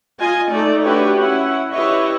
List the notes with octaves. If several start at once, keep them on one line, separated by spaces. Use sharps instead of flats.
F4 D#5 G#5
A3 D#4 D5
D4 E4 F#4 G4 B4 C#5
C#4 E4 F#5
E4 G4 B4 C#5 D#5 E5